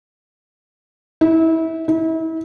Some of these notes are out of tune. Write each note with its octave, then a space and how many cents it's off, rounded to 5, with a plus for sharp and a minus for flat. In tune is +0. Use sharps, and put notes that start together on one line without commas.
E4 -25
E4 -35